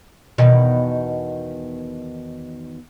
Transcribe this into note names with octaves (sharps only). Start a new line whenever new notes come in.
E2 B2 D#3